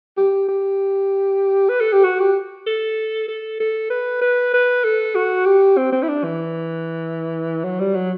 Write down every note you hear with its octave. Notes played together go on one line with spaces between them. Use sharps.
G4
G4
B4
A4
G4
F#4
G4
A4
A4
A4
B4
B4
B4
A4
F#4
G4
C4
C4
E4
D4
E3
F#3
G3
F#3